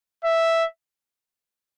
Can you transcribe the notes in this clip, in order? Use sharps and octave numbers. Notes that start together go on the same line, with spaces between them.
E5